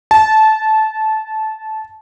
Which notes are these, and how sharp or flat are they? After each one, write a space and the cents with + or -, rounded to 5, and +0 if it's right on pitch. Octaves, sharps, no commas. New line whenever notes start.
A5 -15